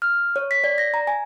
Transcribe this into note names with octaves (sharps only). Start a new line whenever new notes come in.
F6
C#5
B6
D5
A#6
A#5
G#5